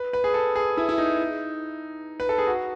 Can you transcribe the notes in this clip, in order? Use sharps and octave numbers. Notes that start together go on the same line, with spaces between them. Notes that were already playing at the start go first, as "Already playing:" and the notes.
Already playing: B4
B4
G#4
A4
G#4
E4
E4
D#4
B4
A4
G#4
F#4